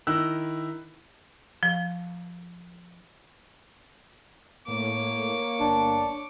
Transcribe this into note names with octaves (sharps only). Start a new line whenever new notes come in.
D#3 D#4 E4 E6 F#6
F3
A2 A#3 C#5 D6
G1 D4